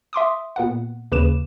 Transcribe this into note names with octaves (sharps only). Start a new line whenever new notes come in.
E5 C6 D6 D#6
A#2 B3 F#5
D#2 C#3 B4 D6 D#7 E7